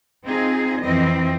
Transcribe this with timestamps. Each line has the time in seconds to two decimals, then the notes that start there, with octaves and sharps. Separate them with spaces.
0.25 C4 D#4 F4 G#4
0.82 F2 E3 C4 E4 D#5